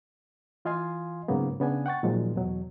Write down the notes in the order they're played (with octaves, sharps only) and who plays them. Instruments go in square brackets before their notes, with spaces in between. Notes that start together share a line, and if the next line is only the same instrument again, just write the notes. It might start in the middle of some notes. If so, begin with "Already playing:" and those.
[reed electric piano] E3 F4 D#5 F5 G#5 C6
G#2 C#3 F#3 A#3 B3
C#3 B3 D4 G#5
F#5 G5 C#6 A6
A#2 D#3 F3 F#3 G#3
E2 B2 F#3